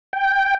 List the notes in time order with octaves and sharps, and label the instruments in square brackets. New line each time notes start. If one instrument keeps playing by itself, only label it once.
[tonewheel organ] G5